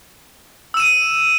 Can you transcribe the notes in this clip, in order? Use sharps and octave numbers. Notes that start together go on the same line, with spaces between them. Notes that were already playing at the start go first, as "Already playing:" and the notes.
E6 D#7 E7